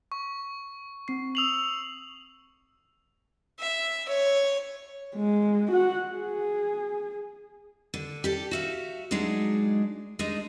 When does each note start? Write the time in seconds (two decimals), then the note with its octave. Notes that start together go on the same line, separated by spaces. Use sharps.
0.12 C#6
1.08 C4 C7
1.35 D#6 E6 C7 F7 F#7
3.60 E5
4.09 C#5
5.16 G#3
5.71 F#4 F#5
6.11 G#4
7.94 D3
8.24 G4 A4 D5
8.51 F#4 E5 F5
9.11 F#3 G#3 D4 D#4 G#4
10.19 G#3 D4 D#4